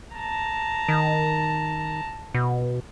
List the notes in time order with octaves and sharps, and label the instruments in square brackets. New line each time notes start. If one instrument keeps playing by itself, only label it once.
[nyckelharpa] A5 A#5
[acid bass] D#3
B2